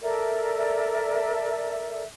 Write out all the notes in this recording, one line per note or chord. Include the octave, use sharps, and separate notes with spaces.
A4 A#4 D5 E5